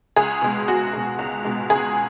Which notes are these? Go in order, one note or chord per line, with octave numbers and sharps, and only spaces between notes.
C#2 G#4
B2 G#3
C#2 F#4
B2 G#3
C#2
B2 G#3
C#2 G#4